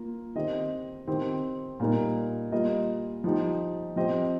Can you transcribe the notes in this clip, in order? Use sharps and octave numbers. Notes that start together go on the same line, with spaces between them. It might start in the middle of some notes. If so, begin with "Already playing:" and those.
Already playing: A#3 F4
D#3 C4 G4 D#5
D#3 C4 G4
A#2 G3 D#4 A#4
G3 A#3 F4 D#5
F3 D#4 G4
F3 C4 G4 D#5